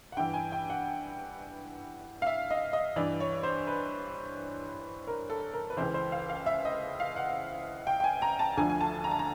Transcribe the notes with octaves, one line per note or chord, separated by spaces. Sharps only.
F#5
G2 E3 G5
G#5
G5
F#5
F5
E5
D#5
D#5
G2 E3 D5
C#5
C5
B4
A#4
A4
A#4
B4
C#2 C#3 E3 C5
C5
F5
F5
E5
D#5
F5
F#5
G5
G5
G#5
A#5
A5
D2 D3 F3 G#5
G#5
A5
A#5
A5
A#5